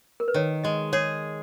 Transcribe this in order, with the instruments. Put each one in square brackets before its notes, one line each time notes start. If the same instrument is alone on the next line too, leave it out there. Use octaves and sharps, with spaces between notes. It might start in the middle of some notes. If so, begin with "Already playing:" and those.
[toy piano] A#4
B4
[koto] D#3 [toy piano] C#5
[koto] G#3 [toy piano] D#5
[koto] G#4 [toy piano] C#5